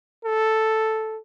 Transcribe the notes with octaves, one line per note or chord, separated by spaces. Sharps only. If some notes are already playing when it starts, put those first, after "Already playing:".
A4